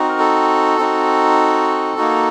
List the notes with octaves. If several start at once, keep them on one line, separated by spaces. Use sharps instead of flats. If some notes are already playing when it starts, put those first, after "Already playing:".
Already playing: C4 D#4 F#4
A#4
A4
C4 D#4 F#4
A#3 D#4 F#4